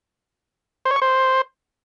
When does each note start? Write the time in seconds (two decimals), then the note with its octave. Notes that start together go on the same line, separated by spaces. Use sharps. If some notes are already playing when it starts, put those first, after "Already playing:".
0.85 C5
0.91 C#5
0.96 C#6
1.02 C5